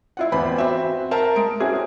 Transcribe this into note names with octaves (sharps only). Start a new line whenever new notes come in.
E4 F4 F#5
E2 B3 C4 B5
C4 F#4 E5
A#4 C5 E5 A5
G#3 D7
C4 C#4 E4 F#4 G#4